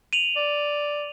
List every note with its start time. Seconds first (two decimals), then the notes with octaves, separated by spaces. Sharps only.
0.13 D#7 F7 F#7
0.36 D5